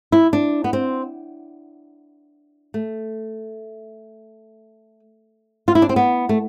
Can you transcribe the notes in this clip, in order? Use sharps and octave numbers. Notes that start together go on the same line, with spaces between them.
E4
D4
B3
C4
A3
F4
E4
D4
C4
B3
A3